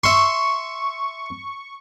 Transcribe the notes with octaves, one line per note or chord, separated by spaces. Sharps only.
E5 C6 C#6